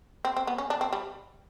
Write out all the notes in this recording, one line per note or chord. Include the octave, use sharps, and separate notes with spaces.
C4
C4
B3
C#4
D4
C4
G3